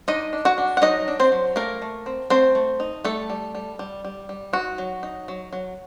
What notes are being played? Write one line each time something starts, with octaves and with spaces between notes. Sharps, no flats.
D4 D#4 D#5
D4
F#4 F#5
D4
F#5
F#3 D#4 D#5
D4
C4 C5
F#3
A3 A#3 A#4
A3
C4
A3 C4 C5
A3
D#4
G3 A3 A4
G3
G3
G3
G3
G3
D#4 F#4
F#3
D#4
F#3
F#3